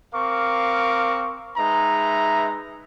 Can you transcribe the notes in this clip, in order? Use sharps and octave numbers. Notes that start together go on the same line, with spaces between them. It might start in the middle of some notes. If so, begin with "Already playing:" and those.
C4 A#4 F5 C#6 D6
G#3 D#4 B4 E5 A#5